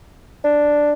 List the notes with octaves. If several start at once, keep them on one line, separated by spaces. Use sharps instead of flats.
D4